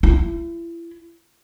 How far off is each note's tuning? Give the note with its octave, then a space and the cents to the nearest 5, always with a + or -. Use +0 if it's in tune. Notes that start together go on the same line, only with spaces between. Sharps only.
E4 +35